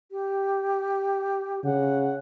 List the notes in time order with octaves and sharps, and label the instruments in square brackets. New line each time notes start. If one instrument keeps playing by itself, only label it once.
[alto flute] G4
[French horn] C#3 [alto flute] F#5